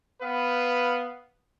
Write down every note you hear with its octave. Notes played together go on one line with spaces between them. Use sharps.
B3 B4 F5